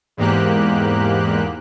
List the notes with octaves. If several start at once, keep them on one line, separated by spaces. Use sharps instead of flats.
E2 G#2 A#3 G4 F#6